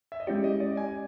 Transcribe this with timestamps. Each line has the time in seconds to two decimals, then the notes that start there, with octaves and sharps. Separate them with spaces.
0.12 E5
0.20 D#5
0.27 G#3 C#4 E4 G4 D5
0.44 D#5
0.60 D5
0.77 G#5